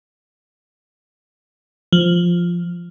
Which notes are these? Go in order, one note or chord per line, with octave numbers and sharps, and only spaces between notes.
F3